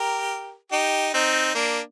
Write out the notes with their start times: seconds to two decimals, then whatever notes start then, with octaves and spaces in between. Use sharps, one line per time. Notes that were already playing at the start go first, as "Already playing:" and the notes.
Already playing: G4 A#4
0.72 D#4 G4
1.14 C4 D#4
1.55 A#3 D4